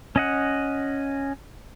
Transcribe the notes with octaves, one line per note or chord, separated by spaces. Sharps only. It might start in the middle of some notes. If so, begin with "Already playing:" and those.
C#4 D#5 F#5